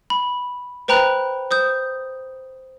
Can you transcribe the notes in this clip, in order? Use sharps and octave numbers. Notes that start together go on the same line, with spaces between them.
B5
B4 C5 G5 A#5 B5 F#6
C5 D#6 G6